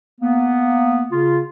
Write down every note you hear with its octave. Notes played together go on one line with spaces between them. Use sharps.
A#3 B3
C#3 F4